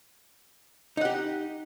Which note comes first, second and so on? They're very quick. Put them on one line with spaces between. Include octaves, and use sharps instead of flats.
D#4 F#5 G4